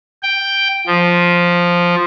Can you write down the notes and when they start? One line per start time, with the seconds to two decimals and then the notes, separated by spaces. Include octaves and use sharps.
0.23 G5
0.87 F3